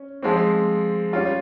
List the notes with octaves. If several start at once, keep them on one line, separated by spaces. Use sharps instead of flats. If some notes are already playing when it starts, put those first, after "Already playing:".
Already playing: C#4
F3 G#3 C4
G3 C#4 F4